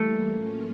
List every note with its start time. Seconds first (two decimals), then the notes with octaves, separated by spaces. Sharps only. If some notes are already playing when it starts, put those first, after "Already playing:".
Already playing: E3 G3 A3 A#3
0.27 A2 F#3 A#3 C#4 F4